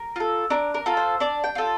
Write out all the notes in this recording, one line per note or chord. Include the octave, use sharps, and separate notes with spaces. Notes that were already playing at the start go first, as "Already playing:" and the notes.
Already playing: A#4
F4 A4
D4 A#4
A#4
F4 A4
C5
D4 D5
G5
F4 A4